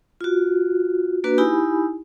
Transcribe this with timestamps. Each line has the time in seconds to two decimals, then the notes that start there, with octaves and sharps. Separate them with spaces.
0.21 F4 F#4
1.24 A#3 D4 F#4 B4
1.38 D#4 E4 G4 G#5 B5